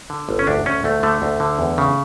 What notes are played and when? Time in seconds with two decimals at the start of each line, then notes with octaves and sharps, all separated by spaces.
0.10 D3
0.29 G1
0.39 C#4
0.47 D2 D4
0.66 D2 C#4
0.84 D2 A3
1.03 D3 A3
1.22 D2
1.40 D3
1.59 E2
1.78 C#3